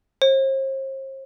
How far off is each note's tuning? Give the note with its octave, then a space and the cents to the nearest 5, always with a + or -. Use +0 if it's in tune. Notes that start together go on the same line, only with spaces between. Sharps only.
C5 +40